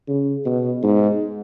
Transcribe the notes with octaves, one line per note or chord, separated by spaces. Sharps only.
C#3
B2
G#2